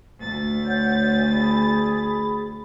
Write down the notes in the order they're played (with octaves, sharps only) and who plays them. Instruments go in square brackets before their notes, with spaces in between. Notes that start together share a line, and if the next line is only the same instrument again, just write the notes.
[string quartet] D2 A6
[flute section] C#5 F#5 G6
G#4 B5